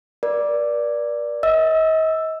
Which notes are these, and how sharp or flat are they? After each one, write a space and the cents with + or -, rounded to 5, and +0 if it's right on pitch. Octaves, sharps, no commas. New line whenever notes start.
A#4 +40 D5 +0
D#5 +40 E6 +5